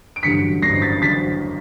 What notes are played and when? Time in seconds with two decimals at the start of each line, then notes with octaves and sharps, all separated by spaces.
0.16 D7
0.23 A1 G2 D3 F#3 B6 C#7
0.62 A1 G2 D3 F#3 A#6 C7
0.82 A6 B6
1.02 D3 F#3 A6 B6